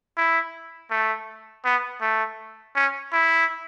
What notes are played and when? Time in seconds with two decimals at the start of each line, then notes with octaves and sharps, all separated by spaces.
0.17 E4
0.91 A3
1.65 B3
2.01 A3
2.75 C#4
3.13 E4